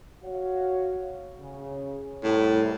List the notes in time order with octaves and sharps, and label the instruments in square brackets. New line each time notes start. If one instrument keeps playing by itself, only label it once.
[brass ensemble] F#4 C#5 F5
C#3
[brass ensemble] C2 [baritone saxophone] A2